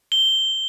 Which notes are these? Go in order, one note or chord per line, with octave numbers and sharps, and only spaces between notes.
G7